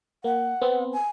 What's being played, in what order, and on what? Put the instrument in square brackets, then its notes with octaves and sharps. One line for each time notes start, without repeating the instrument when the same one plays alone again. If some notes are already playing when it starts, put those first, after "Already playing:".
[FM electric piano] A#3 [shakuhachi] F#5
[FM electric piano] B3 C4
[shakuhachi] G#5